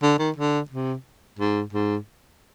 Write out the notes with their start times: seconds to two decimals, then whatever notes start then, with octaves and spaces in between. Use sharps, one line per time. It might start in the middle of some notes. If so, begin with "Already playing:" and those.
0.03 D3
0.19 D#3
0.36 D3
0.70 C3
1.39 G#2
1.73 G#2